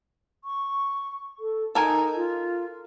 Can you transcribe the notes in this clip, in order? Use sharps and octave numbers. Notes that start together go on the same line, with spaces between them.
C#6
A4
D#4 A4 A#4 G#5
F4